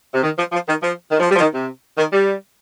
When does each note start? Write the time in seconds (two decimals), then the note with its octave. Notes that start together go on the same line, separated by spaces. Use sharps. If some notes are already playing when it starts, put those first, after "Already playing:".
0.14 C3
0.23 D#3
0.37 F3
0.52 F3
0.67 D#3
0.81 F3
1.11 D#3
1.20 F3
1.30 G3
1.35 F3
1.40 D#3
1.54 C3
1.98 D#3
2.12 G3